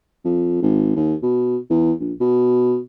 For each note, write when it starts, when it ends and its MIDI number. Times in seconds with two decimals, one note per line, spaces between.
0.25 0.60 41
0.62 0.92 32
0.96 1.14 39
1.23 1.57 47
1.70 1.93 40
2.00 2.13 34
2.20 2.78 47